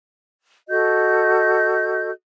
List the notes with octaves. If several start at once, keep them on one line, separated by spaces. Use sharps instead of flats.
F#4 A4 D#5 G6